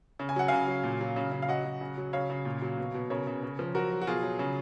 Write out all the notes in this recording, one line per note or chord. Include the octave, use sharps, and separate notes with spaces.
C#3
G#5
F#3 F#5
C#3 F5 G#5
F#3
A#2
F#3
C#3
C#3
F5
F#3 D#5 F#5
F#3
C#3
F#3
C#3 C#5 F5
C#3
A#2
F#3
B2
B2
C#3 A#4 C#5
C#3
C#3
F3
F#3 F#4 A#4
F#3
F#4
B2 F4 G#4
F#3
C#3